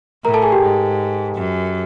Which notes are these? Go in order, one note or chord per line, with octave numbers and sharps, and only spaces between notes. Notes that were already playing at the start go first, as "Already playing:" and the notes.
A2 A#4 A#5
A4 A5
G#4 G#5
G4 G5
G#2
F#2